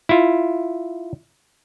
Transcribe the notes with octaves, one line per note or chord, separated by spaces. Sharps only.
E4 F4